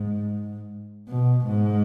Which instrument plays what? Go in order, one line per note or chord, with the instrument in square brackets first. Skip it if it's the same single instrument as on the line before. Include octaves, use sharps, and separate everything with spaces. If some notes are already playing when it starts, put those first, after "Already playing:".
Already playing: [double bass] G#2
B2
G#2